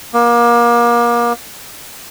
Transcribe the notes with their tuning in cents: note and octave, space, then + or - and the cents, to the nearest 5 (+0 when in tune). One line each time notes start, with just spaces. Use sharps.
A#3 +30